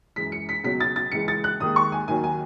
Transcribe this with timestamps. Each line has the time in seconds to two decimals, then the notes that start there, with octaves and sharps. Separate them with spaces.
0.16 F#2 E3 G#3 B6
0.32 C#7
0.49 B6
0.64 C#2 B2 F#3 B6
0.80 A6
0.96 A6
1.12 C#2 C#3 E3 G#3 C#7
1.28 A6
1.44 F#6
1.60 D#2 D#3 G#3 D#6
1.76 C#6
1.92 G#5
2.08 D#2 D#3 F#3 G#5
2.24 G#5